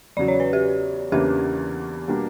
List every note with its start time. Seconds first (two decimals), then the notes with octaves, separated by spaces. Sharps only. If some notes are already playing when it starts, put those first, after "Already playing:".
0.17 E2 C#3 F#3 D5
0.28 C#5
0.40 B4
0.53 G4
1.12 E2 C#3 E3 A#3 D4 G4
2.08 B2 G3 A#3 D4